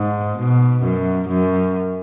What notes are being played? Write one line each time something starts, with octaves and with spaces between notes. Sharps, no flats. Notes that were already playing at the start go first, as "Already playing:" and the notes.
Already playing: G#2
B2
F#2
F#2